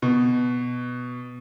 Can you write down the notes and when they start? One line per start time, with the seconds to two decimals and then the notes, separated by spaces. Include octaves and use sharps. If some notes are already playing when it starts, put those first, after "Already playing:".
0.02 B2